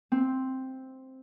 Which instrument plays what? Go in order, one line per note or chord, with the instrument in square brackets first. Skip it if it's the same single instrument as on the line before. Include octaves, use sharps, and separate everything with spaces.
[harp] C4